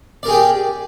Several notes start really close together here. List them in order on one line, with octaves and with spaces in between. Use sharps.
D5 A#4 G#4 G5 G4